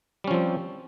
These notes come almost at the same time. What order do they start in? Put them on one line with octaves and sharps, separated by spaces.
G3 C#4 F3 C4